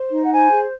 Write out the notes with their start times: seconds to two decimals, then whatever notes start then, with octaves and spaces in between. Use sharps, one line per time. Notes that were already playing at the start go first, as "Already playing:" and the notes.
Already playing: C5
0.10 D#4
0.23 F#5
0.30 C5 G#5
0.50 G#4